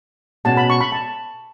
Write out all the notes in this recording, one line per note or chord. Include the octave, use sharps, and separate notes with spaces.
B2 G#3 C#4 A5
B5
C#6
B5
A5